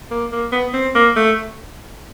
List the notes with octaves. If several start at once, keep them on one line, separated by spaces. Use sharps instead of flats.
A#3
A#3
B3
C4
A#3
A3